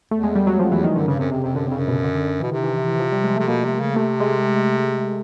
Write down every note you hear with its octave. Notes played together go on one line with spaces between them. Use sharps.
E2 A3
G#3
G3
F#3
F2 F3
E2 E3
D#3
F#2 D3
G2 C#3
F#2 C3
F2 C3
F2 C3
F#2 D3
F2 C#3
F#2
B2
D3
D3
D3
B2 E3
C3 D#3
E3
E3
E3
F3
G3
G#3
C3 A3
B2 A#3
C3
C#3
C3 A3
G#3